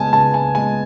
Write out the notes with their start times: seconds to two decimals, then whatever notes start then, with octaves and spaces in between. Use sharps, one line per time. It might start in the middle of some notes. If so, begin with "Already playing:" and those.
Already playing: C#3 G#3 B3 G#5 A5
0.13 C#3 A5
0.34 G#5
0.55 G#3 B3 G#5